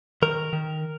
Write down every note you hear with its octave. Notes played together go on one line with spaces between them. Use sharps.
D#3 A#4
D#3